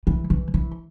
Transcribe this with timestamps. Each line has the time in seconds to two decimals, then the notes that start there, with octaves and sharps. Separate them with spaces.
0.07 E3
0.30 E3
0.54 E3